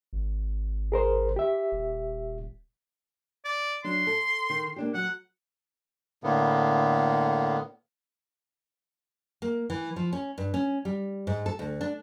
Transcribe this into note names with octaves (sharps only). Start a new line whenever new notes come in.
G#1
G#4 A#4 C5
G4 E5
D#1
D5
F#3 D4 C6
A4
D#3
A#3 D4 G4
F#3 F#5
A2 D3 A#3 B3
A#3
E3
F3
C#4
G2
C#4
G3
G#2
A4
D2
D4